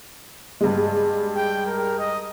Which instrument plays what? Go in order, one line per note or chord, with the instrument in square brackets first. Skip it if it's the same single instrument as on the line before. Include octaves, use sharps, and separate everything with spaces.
[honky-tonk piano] G2 G#3
[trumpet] G5
A#4
D#5